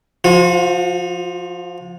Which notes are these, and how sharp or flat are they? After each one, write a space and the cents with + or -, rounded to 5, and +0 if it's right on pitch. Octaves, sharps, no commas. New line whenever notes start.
F3 +0 F#4 -40